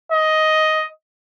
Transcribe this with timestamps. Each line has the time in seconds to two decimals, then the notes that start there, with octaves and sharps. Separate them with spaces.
0.12 D#5